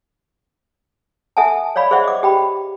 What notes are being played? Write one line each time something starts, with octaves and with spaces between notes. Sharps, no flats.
A4 E5 F#5 G#5 A5
C#5 D5 F5 B5
G#4 C5 D5 E5 F#5
D#5 D6
G4 G5 B5